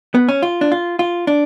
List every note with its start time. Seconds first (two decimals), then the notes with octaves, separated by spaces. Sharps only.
0.15 B3
0.29 C#4
0.43 F4
0.61 D4
0.72 F4
0.99 F4
1.27 D4